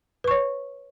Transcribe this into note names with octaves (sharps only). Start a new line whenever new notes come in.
B4 C#5 C#6